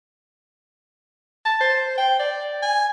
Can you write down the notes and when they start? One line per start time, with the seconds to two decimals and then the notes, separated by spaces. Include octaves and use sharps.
1.46 A5
1.61 C5
1.98 G5
2.19 D5
2.62 G#5